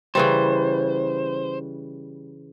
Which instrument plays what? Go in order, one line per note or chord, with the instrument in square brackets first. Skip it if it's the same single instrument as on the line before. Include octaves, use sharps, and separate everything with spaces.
[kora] C#3 E3 G3 [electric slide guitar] C5